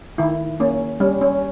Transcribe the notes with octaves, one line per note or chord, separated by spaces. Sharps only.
D#3 E4
A#3 C#4
G3 C#4
C#4